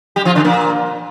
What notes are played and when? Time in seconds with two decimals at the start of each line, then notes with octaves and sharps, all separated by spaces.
0.16 G3 G4
0.25 F3 F4
0.35 D3 D4
0.44 A#2 A#3